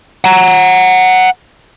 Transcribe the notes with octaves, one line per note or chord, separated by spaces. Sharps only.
F#5 A#5